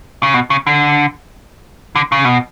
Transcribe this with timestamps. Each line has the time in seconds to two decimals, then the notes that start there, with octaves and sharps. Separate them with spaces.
0.23 C#3
0.34 B2
0.50 C#3
0.67 D3
1.96 D3
2.12 C#3
2.25 B2